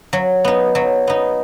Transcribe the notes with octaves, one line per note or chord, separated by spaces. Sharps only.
F#3
B3 D#4
F#3
B3 D#4